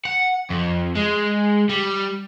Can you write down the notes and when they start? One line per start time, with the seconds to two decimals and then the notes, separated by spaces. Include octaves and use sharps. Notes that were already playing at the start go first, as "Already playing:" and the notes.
0.05 F#5
0.50 F2
0.96 G#3
1.69 G3